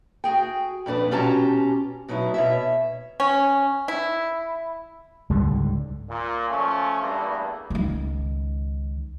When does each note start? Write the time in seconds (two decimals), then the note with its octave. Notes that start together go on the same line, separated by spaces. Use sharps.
0.24 F#4 G#4 G5
0.86 F2 A#2 D4 B4
1.11 B2 C#4 F4 G4 A5 A#5
2.08 B2 F#3 D#4 E4
2.34 B2 C#5 E5
3.20 C#4
3.88 E4
5.30 C#2 G#2 D3 G3
6.10 A#2
6.50 F3 A3 C#4
7.02 E2 G2 A3 A#3
7.70 C#2 D#3